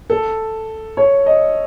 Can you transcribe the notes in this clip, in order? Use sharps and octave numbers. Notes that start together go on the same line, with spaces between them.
A4
C#5
D#5